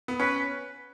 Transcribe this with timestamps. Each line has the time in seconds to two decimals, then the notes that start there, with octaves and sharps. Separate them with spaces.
0.08 B3
0.20 C#4 B4